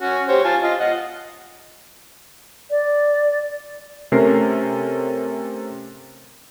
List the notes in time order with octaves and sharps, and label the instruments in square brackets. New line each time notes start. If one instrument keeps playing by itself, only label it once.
[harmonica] C#4 F#4
G4 C5 C#5
F4 G#5 A5
F4 D#5
D#5 F#5
[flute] D5
[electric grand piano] C3 A3 C#4 A#4 C7